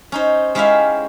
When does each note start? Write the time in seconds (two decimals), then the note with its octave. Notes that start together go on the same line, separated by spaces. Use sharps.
0.12 C#4 D#4 C5
0.55 G#3 C#4 E4 G4 E5 F5